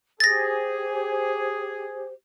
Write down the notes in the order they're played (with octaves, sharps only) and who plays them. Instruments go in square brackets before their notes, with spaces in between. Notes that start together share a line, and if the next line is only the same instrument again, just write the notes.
[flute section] G4 C5 [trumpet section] G#4 [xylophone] A6 A#6